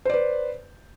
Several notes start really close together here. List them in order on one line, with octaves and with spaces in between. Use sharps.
C5 D5 B4